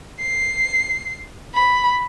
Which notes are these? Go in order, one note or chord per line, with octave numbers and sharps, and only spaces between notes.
C7
B5